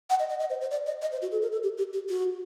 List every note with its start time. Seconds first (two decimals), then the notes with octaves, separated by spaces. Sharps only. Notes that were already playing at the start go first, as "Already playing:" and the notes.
0.10 F#5
0.19 D#5
0.29 D#5
0.40 D#5
0.50 C5
0.61 C5
0.71 D5
0.86 D#5
1.02 D#5
1.12 C5
1.22 F#4
1.32 A4
1.42 A#4
1.52 A4
1.63 G4
1.78 G4
1.93 G4
2.09 F#4